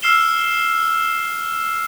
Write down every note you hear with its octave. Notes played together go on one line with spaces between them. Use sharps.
E6 F6 C7 E7 G7